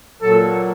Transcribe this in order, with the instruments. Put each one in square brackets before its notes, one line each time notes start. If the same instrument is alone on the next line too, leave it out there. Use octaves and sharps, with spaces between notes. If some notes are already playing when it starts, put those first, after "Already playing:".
[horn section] A#2 F#3 A4